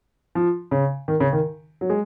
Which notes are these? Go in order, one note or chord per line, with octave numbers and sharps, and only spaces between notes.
F3
C#3
D#3
C#3
D#3
F#3
G#3